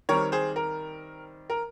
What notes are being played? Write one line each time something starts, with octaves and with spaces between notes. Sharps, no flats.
D#3 G3 C4 A#4 C#5
G#4 C5
A#4
A#4